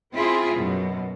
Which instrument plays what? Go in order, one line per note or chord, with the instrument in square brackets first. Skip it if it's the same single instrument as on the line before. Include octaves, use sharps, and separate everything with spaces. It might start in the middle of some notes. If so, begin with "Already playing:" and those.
[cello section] C4 E4 F4 G#4
F#2 B2